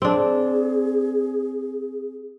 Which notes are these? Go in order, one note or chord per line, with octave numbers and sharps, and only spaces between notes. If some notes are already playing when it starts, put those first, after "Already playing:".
C4 D4 G#4